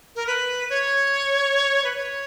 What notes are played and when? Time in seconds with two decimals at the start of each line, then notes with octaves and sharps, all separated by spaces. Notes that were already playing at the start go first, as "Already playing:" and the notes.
0.16 A#4
0.27 B4
0.70 C#5
1.84 B4
1.95 C#5